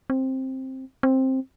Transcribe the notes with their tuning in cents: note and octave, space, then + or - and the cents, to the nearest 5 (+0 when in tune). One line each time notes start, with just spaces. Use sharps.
C4 +10
C4 +10